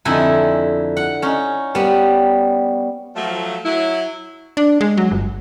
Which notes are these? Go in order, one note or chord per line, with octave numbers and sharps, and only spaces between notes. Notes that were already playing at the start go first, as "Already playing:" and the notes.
F2 D3 D#4 E4 G#5
F#5
C#4 D#4
G3 B3
F3 F#3 A3
F#3 E4
D4
G#3
F#3
G1